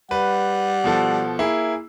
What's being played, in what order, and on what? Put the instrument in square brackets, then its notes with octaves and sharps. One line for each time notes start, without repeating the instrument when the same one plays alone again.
[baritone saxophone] G3 [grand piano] B4 [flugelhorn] F#5
[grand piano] B2 F3 A4
A#3 E4 G#4